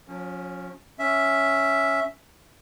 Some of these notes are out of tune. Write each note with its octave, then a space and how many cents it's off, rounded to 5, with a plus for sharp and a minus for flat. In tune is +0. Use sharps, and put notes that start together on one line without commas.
F3 +45 C#4 +0
C#4 +0 E5 +0